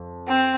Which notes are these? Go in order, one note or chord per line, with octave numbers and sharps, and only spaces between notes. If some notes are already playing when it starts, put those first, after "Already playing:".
Already playing: F2
C4